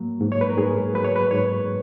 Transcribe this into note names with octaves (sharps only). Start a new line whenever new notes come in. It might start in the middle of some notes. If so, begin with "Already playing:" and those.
Already playing: G#2 F#3 A#3
G#2
C#5
B4
A#4
G#2 G#4
F#3 B4
C#5
B4
G#2 C#5